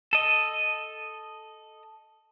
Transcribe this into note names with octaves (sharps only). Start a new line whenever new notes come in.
A4 D#5